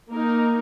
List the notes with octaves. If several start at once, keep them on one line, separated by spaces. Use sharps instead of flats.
A#3 D#4 A#4